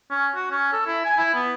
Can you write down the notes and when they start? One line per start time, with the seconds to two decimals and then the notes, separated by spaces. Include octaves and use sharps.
0.11 C#4
0.35 F#4
0.51 C#4
0.73 A4
0.87 E4
1.05 G#5
1.17 E4
1.35 B3